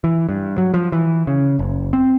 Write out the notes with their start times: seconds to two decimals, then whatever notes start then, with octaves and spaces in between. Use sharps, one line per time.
0.04 E3
0.29 G2
0.58 F#3
0.74 F3
0.92 E3
1.27 C#3
1.59 F#1
1.93 C4